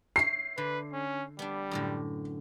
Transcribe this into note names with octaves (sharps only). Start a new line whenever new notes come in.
C#5 E5 C7
D3 B4
C#4
G3 B3 D4
F#2 A2 D3